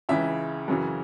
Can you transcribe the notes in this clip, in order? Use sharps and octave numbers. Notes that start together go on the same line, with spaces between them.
C#2 C#3 E3 E5
F#2 C#3 E3